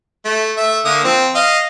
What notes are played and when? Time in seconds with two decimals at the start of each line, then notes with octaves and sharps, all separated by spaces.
0.25 A3
0.57 A3 E5
0.85 D3 A#3 D#6
1.04 F3 C4
1.35 D#5 F5